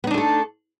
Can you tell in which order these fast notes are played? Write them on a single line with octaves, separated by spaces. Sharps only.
B3 D#4 D4 A3 A4